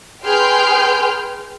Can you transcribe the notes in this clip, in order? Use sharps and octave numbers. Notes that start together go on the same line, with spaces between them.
G#4 B4 G5 C6 F6 G6